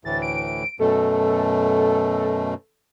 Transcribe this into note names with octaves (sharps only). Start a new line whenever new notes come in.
D2 A2 E3 A6
D7
F#2 B2 A3 A4